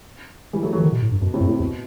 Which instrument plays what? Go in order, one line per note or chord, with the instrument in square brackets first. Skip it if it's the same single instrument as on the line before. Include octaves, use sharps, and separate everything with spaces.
[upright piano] E3 G3
F#3 A3
F#3 A3
[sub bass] E3
D#3
B2
A2
G2
[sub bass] F#2 [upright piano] B2
[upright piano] A2 C3
[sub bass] F#2
[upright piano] A2 C3
[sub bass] E2 [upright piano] B2